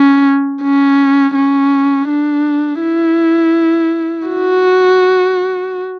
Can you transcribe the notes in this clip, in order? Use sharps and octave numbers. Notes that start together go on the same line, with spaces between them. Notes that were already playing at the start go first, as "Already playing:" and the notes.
Already playing: C#4
C#4
C#4
D4
E4
F#4